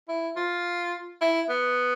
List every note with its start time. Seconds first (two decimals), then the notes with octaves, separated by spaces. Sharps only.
0.09 E4
0.36 F4
1.21 E4
1.50 B3